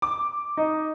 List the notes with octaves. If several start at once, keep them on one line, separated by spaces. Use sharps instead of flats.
D6
D#4